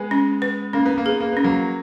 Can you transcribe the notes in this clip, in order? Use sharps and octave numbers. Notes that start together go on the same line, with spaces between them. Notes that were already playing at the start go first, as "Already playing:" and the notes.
Already playing: G#3 B3
C#4
B4
A#3 C#4
B3
A#3
B3 G#4
A#3
B3 C#4
F#3 A#3